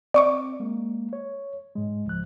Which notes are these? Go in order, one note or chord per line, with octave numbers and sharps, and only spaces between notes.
C4 D5 C#6 D6
G#3 A#3
C#5
G#2 G#3
C#2 F3 F#6